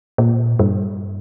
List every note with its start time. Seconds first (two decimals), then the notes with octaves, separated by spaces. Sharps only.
0.18 A#2
0.59 G2